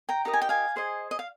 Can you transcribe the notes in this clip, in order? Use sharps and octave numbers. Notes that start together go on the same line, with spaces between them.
G5 A#5
D#4 G4 A#4 D#5 A#5
G#5
G5
F5 G#5
G#4 C5 D#5
D#5
F5